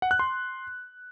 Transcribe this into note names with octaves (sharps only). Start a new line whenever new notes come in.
F#5
F#6
C6